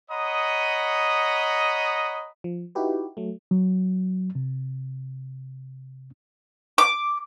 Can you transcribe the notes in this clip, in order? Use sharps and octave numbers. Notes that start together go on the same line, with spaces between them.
C#5 D#5 F#5 A#5 B5 D#6
F3
D#4 E4 F#4 G4 B4
F#3 A3
F#3
C3
D6